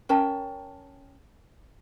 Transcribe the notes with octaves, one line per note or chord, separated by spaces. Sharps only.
C#4 A#4 G5 A5